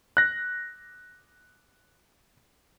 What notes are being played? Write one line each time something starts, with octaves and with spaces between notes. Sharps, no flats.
F#6 A#6